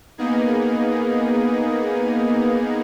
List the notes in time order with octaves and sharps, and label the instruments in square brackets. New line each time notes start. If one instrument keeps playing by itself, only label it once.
[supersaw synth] A#3 B3 D#4 G#4